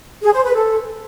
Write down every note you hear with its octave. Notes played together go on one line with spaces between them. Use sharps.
G#4
C5
B4
A4